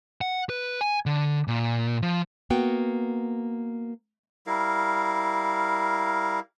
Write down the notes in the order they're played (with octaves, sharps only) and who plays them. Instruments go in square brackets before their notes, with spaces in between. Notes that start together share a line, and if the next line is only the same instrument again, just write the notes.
[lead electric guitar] F#5
B4
G#5
D3
A#2
F3
[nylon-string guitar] A#3 B3 F#4 G5
[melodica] G3 E4 A#4 F5